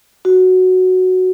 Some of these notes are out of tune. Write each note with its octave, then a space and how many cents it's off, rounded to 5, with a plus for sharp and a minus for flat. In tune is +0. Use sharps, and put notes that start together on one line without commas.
F#4 +0